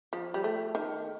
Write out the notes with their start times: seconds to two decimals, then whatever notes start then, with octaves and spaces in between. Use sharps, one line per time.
0.13 F3
0.34 G3
0.44 A3
0.75 D#3